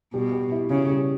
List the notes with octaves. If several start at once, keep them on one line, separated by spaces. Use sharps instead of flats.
B2 G3
G4
E4
C#3 C#4
G3